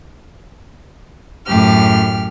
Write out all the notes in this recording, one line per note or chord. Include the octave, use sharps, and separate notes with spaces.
F#2 A2 G4 F6